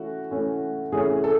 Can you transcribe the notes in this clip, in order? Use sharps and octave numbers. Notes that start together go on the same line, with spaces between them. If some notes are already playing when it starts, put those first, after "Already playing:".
Already playing: E3 A3 C#4 F#4
E3 A3 C#4
E3 A3 C#4 G#4
A4